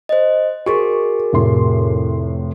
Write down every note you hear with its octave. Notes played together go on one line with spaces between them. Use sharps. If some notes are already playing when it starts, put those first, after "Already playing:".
C5 D#5
F#4 G#4 A#4 C#6
F1 A2 C6